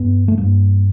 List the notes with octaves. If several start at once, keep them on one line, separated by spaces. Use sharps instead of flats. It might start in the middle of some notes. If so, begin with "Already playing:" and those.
Already playing: G2 B3
A3
G2 A#3